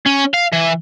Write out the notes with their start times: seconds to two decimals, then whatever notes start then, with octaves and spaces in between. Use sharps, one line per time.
0.06 C#4
0.34 F5
0.53 E3